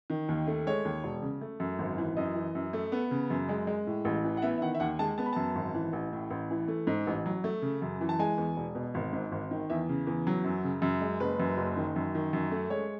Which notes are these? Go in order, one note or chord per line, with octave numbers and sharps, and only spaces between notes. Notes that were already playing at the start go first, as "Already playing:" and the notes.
D#3
D#2
A3
G#3 C#5
D#2
E1
C#3
A3
F#2
G#1
E3
F#2 D#5
E3
F#2
A3
B3
C#3
F#2
G#3
G#3
A2
A1
E3
F#5
B3 E5
E5
D#3 F#5
E5
D#2 F#5
G#3 A5
B3 A5
B5
F#2 A5
G#1
E3
A1
A2
A1
E3
A3
G#2
A1
F#3
A3
C#3
F#2
E3
A5
G#3 G#5
E2
E1
B2
G#1
G#2
G#1
D#3
E2 E5
C#3
E2
F#3
F#2
C#3
F#2
G#3
F#1 B4
F#2
F#1
D#3
F#2
D#3
F#2
A3
G#3 C#5